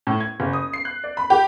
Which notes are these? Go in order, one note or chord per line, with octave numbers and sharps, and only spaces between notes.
A2
G#6
F#1
D#6
C7
F#6
D5
B5
G4